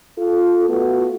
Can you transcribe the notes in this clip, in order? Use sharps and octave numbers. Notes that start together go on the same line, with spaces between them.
F4 A4
A3 B3 F4 F#4